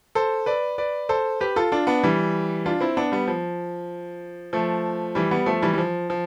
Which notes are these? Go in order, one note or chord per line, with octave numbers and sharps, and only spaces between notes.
A4 C5
B4 D5
B4 D5
A4 C5
G4 B4
F4 A4
D4 F4
B3 D4
E3 G3
D4 F4
C4 E4
B3 D4
G3 B3
F3
F3 A3
E3 G3
G3 B3
F3 A3
E3 G3
G3
F3
F3